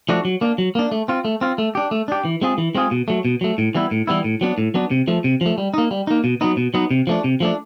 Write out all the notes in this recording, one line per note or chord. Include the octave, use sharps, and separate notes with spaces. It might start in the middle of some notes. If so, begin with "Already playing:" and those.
F3 A3 D4 F#4
F#3
A#3 D4
F#3
A#3 D4
A3
C4 F4
A3
C4 F4
A3
D4 G4
A3
D4 G4
E3
G#3 C4 F4 G#4
E3
G#3 C4 F4 G#4
B2
F#3 A3
B2
F#3 A3
A2
E3 G3 B3 E4
A2
E3 G3 B3 E4
A2
F#3 B3 D4
A2
F#3 B3 D4
C3
F3 A3
C3
F3 A3
G3
A#3 D#4
G3
A#3 D#4
B2
F#3 B3 D#4
B2
F#3 B3 D#4
C3
F3 A3 D4
C3
F3 A3 D4